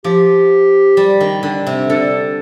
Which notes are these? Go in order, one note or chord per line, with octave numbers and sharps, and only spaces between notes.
F3 G4
G3
D#3
D3
C3
D3 A4